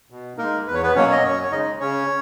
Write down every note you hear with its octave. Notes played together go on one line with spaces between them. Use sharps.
B2
G#3 A#3 D#4 A#4
E2 B4
C#5
B3 B4
B2 F#3 A#3 C#4 C#5
D#5
F#2 C#4 C#5
C#5
C#3 G#3 D#4 D#5
C#3 C#4 C#5